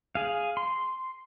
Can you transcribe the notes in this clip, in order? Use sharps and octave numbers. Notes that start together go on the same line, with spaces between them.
G#4 F5
C6